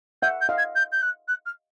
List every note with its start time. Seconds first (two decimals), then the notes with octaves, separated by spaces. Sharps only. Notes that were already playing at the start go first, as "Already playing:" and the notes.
0.22 E5 F#5 G6
0.41 G6
0.49 D#5 F5
0.57 G#6
0.75 G6
0.92 G6
1.01 F#6
1.28 F#6
1.45 F6